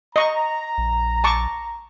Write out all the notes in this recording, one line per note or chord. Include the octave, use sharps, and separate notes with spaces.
D#5 A#5 C#6
A#1
A5 C#6 D6